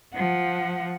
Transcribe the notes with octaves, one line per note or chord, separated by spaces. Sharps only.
F3 F#5